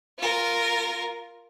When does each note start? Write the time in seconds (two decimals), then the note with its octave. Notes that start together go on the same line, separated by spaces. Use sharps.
0.18 F4 A#4